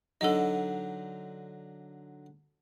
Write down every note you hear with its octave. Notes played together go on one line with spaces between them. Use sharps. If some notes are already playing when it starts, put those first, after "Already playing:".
D3 F#3 D#4 A4 D#5